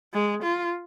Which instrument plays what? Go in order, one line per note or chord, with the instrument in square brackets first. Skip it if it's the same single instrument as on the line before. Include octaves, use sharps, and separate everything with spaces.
[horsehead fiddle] G#3
F4